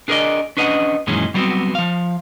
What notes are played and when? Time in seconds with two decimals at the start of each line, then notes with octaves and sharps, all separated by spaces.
0.08 D4 G#4 A#4 B4 D5 D#5
0.57 C#4 D4 B4 D#5 F5 F#5
1.07 F#2 A#2 D#3 E3 G#3 C#4
1.34 F#3 G3 B3 C4 F#4
1.75 F3 F5